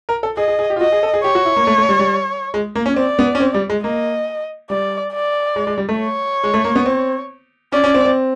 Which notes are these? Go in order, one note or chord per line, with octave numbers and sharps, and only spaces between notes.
A#4
A4
G#4 D#5
G#4
G#4
G4
F4
F#4 D#5
G#4
A4
G#4
G4 C#5
F#4
E4
A#3
A3
A3
G3
G3
G#3
A#3
C#4
C4 D5
B3
C#4
C4
G3
G#3
A#3 D#5
G3 D5
D5
G#3
G#3
G3
A3
C#5
G#3
A3
A#3
B3
C4
C#4 D5
C#4
C4
C4